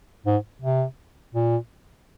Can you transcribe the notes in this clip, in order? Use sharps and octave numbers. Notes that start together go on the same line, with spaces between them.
G#2
C3
A#2